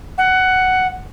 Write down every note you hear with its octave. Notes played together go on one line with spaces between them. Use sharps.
F#5